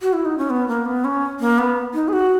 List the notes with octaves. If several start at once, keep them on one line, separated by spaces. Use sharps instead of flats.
F#4
E4
D#4
C#4
B3
A#3
B3
C#4
A#3
B3
D#4
G#4
F#4